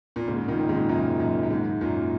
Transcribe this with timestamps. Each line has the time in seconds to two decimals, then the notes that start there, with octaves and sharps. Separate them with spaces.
0.16 A#2
0.28 G#2 C#3
0.48 A#2 D#3
0.59 D#3
0.69 G#2 C#3
0.89 F#2 A#2
1.20 F#2
1.43 F#2
1.50 G#2
1.81 F#2 A#2